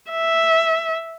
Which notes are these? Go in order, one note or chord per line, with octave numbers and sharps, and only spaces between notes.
E5